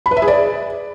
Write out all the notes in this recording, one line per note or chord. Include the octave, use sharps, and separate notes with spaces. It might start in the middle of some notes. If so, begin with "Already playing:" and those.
B5
B4
E5
G#4
D5